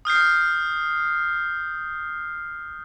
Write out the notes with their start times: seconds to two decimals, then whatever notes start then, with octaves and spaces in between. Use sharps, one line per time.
0.05 D#6 F6 G6 C7